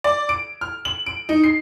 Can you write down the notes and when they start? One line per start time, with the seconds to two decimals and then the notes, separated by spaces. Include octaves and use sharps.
0.04 D5
0.29 D7
0.61 F6
0.85 F#7
1.06 D7
1.29 D#4
1.44 C7